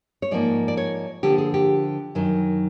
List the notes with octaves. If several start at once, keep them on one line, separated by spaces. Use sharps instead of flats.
C#5
G#2 F3 A#3 D#4 D5
D5
C#5
D3 F3 A#3 G4
G#4
G4
F#2 D#3 F#3